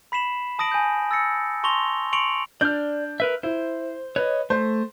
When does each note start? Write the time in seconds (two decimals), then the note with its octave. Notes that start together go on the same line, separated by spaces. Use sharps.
0.12 B5 B6 C7 E7 F#7
0.59 A5 D#6 A#6 D7 F#7
0.71 G#5 G6
1.11 E6 A6 A#6 C#7
1.63 A5 C6 C#6 A#6 F7 G7
2.13 C6 C#6 C#7 D7 F7 F#7
2.61 D4 D5 F6 G6
3.20 A#4 B4 E5
3.43 E4 C5
4.16 B4 C#5 D#5
4.50 A3 C5